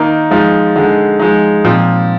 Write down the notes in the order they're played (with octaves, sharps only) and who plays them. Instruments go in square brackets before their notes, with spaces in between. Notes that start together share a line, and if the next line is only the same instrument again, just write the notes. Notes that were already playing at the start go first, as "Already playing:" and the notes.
Already playing: [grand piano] D#3 A#3 D#4
F3 G#3 D#4
D3 G#3 D#4
F3 G#3 D#4
A#2 F3 C4